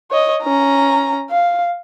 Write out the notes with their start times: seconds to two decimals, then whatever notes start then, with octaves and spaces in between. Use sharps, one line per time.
0.11 C#5 D#5
0.43 C#4 A#5
1.31 F5